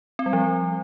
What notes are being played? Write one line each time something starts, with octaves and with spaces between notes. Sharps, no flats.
C4
G3
F3